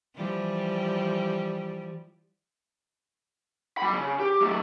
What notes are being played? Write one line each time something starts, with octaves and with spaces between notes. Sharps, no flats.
E3 F3 G3
F#3 B5
C#3
G4
F#3 A3